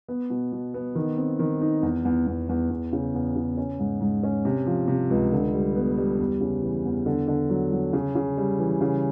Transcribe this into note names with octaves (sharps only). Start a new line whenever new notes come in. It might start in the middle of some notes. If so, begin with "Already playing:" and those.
B3
B2
B2
B3
D#3
C4
D#3
D#4
E2
E2
E2
E2
E2
C#3
E2
C#3
C#4
G#2
G#2
C#4
C3
F3
C3
C#2
D3
G3
B3
G3
E2
C#3
E3
E2
D3
D3
F#3
F#3
C#3
C#3
G3
E3
C#3